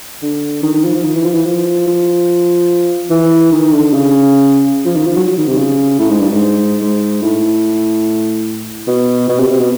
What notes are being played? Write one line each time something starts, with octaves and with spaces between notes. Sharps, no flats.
D3
D#3
D#3
F3
F3
D#3
E3
F3
E3
F3
F3
E3
D#3
D3
C#3
F3
D#3
F3
F#3
F#3
D#3
C3
C#3
A2
G#2
G2
G#2
G#2
A2
B2
B2
C3
C3
B2